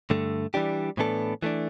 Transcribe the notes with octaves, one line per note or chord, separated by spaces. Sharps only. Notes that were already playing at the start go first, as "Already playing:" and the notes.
G2 D3 A3
E3 G3 D4 G4
A2 E3 B3 D4 A4
E3 A3 D4